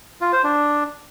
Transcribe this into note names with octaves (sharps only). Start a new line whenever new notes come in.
F4
C5
D4